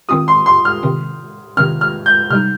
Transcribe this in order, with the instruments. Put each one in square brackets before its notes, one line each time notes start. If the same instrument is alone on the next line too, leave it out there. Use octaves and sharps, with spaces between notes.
[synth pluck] D#3 C4 F4 [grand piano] D#6
[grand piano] C6
C6
F6
[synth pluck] C3 D#3 C4
[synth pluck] C3 D#3 C4 [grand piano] F6
[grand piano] F6
G6
[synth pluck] C3 G3 D#4 [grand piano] F6